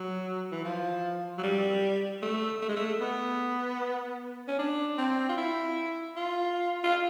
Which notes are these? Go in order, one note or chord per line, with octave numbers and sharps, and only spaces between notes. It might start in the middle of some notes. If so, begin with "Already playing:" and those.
Already playing: F#3
E3
F3
F#3
G3
A3
A3
G#3
A3
B3
C#4
D4
C4
F4
E4
F4
F4